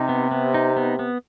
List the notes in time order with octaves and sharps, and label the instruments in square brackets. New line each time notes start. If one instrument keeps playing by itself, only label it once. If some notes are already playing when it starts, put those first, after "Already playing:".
Already playing: [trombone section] C3 [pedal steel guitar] D#4
[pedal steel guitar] B3
B3
D#4
B3
B3